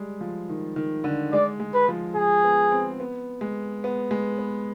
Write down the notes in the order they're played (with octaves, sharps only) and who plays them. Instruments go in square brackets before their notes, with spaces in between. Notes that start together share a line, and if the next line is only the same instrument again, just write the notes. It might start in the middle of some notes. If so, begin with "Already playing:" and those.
Already playing: [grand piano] G3 G#3
F3
D#3
D#3
D3
[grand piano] G#3 [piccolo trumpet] D5
[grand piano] G#3
[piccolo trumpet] B4
[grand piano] F3
[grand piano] F3 [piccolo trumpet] G#4
[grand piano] B3
C4
B3
G#3
B3
G#3
B3